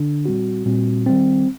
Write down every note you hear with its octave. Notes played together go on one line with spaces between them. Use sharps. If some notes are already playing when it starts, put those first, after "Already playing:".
Already playing: D3 D4
A#2 G3 C4 F#4
A#2 G3 C4 F#4
D#3 G3 C4